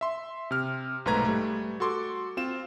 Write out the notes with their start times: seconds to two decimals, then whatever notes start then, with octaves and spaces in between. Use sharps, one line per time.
0.01 E5 C6
0.51 C3 F6
1.05 B1 G#2 A3 B4 A#5 G#6
1.25 G3 A3
1.80 F#4 A4 C6 D6
2.37 C4 F4 E7